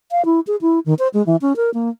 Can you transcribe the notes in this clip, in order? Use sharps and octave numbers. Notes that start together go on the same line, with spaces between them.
F5
E4
G#4
E4
D#3
C5
G#3
E3
C#4
A#4
A#3